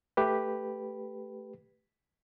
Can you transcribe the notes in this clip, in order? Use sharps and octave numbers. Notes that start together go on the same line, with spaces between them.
A3 G4 B4